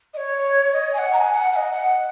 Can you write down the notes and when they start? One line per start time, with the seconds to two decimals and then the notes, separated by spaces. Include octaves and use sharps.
0.14 D#5
0.17 C#5
0.73 D#5
0.93 G#5
0.98 F#5
1.13 A#5
1.17 G#5
1.33 F#5
1.52 F#5
1.56 D#5
1.73 F#5